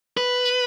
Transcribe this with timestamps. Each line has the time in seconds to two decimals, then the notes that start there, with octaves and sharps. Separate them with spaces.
0.17 B4